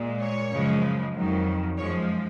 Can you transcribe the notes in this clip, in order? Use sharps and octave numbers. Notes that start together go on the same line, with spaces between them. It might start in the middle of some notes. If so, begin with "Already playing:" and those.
Already playing: A#2 G#3
C#5
F#2 C#3 F3 G#3
F2 D#3 F#3
F#2 F3 G#3 C#5